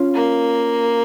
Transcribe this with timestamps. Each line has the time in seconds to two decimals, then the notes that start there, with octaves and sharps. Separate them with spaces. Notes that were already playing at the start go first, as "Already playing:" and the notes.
Already playing: C#4 F4
0.14 A#3